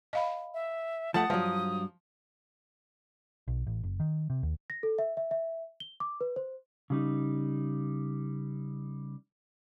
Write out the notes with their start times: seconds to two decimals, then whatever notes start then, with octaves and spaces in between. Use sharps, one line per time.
0.13 D#5 F5 B5
0.54 E5
1.14 F3 A3 F#5 A5 D#6
1.30 G2 F3 F#3
3.48 B1
3.67 A1
3.83 F#1
4.00 D#3
4.30 C3
4.43 D#2
4.70 A#6
4.83 A4
4.99 E5
5.17 E5
5.31 E5
5.80 G7
6.00 D6
6.21 B4
6.36 C5
6.90 C#3 G3 D#4